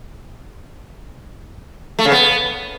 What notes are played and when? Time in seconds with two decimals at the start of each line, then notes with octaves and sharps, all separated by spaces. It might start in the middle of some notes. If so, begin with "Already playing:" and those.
1.99 A3
2.05 C#3
2.12 B3